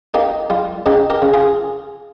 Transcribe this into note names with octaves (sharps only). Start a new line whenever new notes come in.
A#3 D#4 G4
G3 F4
C#3 D#4 G4
G4 A#4
C#3
F4 G#4